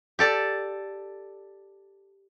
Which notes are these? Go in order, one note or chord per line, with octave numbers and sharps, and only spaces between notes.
G4 A4 D5